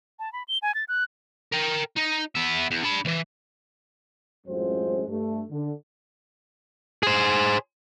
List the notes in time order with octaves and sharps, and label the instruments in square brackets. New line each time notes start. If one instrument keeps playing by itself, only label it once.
[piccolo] A5
B5
G7
G#5
A6
F#6
[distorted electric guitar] A#4 G5
D#4
B3 E5
E2
D4 B5
D2 E3
[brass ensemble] A1 F#2 G#3 C4 F4 C5
G2 A3
D3
[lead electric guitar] G#4 C5